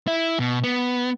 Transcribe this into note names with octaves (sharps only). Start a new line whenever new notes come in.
E4
B2
B3